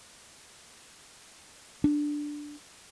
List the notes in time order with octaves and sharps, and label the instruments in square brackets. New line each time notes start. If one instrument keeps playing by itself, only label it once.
[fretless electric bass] D4